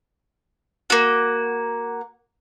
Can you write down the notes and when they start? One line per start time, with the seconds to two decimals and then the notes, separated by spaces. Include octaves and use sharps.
0.90 A#3 F#4